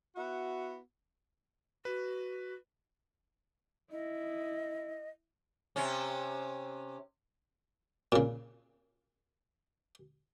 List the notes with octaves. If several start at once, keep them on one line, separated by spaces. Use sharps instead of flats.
B3 E4 F#4
F#4 B4
E4 D#5
C3 C#4
A#2 C#3